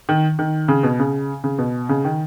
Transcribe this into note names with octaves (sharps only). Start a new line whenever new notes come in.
D#3
D#3
C#3
B2
C#3
C#3
B2
C#3
D#3